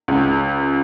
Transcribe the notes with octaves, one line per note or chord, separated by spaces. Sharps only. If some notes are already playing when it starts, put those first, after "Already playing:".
C#2